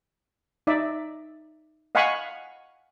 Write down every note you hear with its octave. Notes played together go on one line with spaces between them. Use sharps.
D#4 D5 E5
D#5 F5 F#5 G#5 B5 C#6